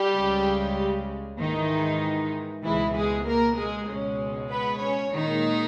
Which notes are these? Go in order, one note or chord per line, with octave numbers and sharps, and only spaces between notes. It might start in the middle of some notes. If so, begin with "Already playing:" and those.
Already playing: G3 G4
C#2 C#3 G#3
G#2 D#3 E3 G#3 D#4
C#2 B2 E3 G#3 E4
G#3 G#4
A#3 A#4
G#3 G#4
C#2 B2 G#3 C#4
B3 B4
C#4 C#5
A#2 D#3 G#3 D#4